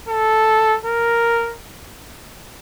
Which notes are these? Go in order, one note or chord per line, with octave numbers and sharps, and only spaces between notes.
A4
A#4